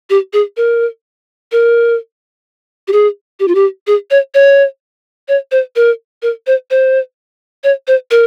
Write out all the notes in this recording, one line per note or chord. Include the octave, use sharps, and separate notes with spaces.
G4
G#4
A#4
A#4
G4
G#4
G4
F4
G4
G#4
C#5
C#5
C#5
C5
A#4
A#4
C5
C5
C#5
C5
A#4